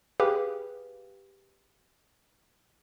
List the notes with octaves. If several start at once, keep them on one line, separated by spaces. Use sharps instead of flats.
G4 G#4 B4 F5